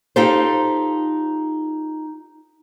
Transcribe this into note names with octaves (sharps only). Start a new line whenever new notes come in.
D#4 F4 G4 A4 C5